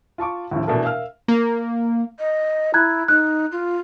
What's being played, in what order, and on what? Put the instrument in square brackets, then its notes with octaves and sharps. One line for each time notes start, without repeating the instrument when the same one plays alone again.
[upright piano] F4 A5 C#6 D6
D#2 A2 C#3 F3
B2 E3 A3 D4 A4 A#4
A#4 E5 F5 E6 F6
[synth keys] A#3
[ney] D#5
[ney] E4 [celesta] A#5 F#6 G#6
[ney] D#4 [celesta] F#6
[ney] F4